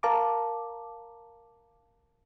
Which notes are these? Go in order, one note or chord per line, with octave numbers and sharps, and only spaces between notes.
A#4 F5 A5 A#5 D6